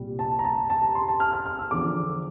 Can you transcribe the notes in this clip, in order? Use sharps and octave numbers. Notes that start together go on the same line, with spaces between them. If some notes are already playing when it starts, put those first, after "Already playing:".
Already playing: C2 A#2 G3
A5
A#5
A5
A5
A#5
C6
A5
F6
F6
F6
E6
E2 D3 F3 D6